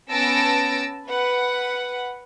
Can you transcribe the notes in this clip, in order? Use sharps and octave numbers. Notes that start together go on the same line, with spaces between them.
B3 C#4 A5 E6 A#6 D7
B4 F#5